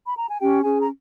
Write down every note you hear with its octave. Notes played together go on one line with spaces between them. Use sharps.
B5
A#5
G#5
C#4 G4 G5
C#4 G#4 G#5
A#5